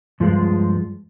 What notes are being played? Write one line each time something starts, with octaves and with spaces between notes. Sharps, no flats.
G2 F3 G#3